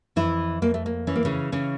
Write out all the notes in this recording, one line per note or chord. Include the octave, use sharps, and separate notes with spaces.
F2 E3 E4
F2 A#3
A3
A#3
E3 C#4
A#3
C#3 C#4
C#3 E3 C#4